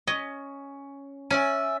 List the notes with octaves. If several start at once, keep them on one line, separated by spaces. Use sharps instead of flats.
C#4 D#5
C#4 D5 E5 G#5